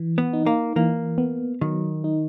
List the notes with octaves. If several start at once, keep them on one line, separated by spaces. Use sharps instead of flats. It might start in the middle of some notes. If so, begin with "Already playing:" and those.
Already playing: E3
B3
D#4
A#3
E3 A#3
B3
D#3 F#3
D#4